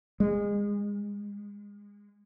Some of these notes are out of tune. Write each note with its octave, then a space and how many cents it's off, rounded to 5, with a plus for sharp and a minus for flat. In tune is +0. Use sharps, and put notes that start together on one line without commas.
G#3 -25